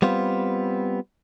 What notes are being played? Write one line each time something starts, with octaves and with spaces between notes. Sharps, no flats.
G3 B3 C4 F4